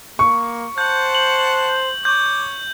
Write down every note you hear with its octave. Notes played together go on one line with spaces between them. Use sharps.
A#3 C#6
C5 F#5 A5 G6
F#7
C#5 D6 G6